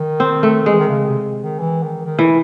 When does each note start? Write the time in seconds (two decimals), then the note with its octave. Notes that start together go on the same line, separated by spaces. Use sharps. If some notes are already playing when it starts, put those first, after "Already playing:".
Already playing: D#3
0.20 C4
0.43 A3
0.66 E3 G#3
0.79 D#3
0.89 C#3
1.07 C3
1.42 D#3
1.59 E3
1.83 D#3
2.06 D#3
2.19 E3